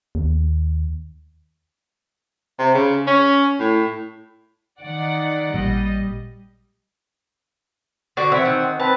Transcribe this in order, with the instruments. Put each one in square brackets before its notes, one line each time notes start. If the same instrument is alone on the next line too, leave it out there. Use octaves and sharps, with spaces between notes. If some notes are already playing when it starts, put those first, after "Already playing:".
[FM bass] D#2
[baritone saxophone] C3
C#3
C#4
A2
[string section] D#3 D5 F#5
[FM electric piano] A1 A#2 [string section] G3 D#5
[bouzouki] D3 F#4
[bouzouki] E3 E5 [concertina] C4 F#5
[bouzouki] D#3
[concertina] C4 B4 [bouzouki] A5